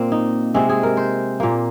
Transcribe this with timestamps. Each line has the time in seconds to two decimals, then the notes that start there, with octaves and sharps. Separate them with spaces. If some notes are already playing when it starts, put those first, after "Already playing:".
Already playing: A#2 A#3 C4
0.12 D#4
0.54 C3 G#3 C4
0.69 G#4
0.83 A#4
0.97 C5
1.40 A#2 A#3